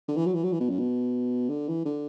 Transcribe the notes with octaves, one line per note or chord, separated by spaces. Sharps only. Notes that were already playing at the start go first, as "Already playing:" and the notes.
D3
E3
F#3
E3
F#3
E3
B2
F#2
B2
D3
E3
D3